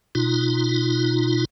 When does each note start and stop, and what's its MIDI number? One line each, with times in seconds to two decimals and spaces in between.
0.15 1.45 47
0.15 1.45 63
0.15 1.45 65